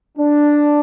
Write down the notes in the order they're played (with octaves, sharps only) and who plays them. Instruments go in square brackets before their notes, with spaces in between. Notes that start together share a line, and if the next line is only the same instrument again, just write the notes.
[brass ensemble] D4